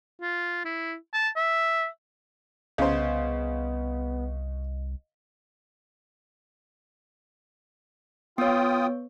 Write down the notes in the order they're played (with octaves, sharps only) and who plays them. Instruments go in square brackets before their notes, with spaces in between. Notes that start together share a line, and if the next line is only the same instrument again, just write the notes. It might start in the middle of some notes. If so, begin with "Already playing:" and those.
[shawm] F4
E4
A5
E5
[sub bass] C2 [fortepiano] C#3 C5 [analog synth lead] B3 [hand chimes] D#5
[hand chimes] B3 C#5 [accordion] F4 G5 D#6